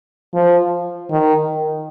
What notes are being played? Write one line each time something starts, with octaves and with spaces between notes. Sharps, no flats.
F3
D#3